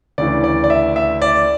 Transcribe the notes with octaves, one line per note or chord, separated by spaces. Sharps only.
D2 C#3 E3 D5
D5
D5
E5
E5
D5